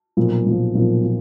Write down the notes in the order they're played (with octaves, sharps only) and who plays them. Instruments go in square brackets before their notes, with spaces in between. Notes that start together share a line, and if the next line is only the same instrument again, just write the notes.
[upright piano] B1 A#2 F3
B1 A#2 F3
B1 A#2 F3
A#2